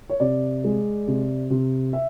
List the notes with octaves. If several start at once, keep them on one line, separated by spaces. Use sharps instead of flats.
C#5
C3 D5
G#3
C3
C3
E5